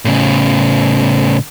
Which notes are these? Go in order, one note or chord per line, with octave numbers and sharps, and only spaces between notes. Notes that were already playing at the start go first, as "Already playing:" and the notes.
A2 C#3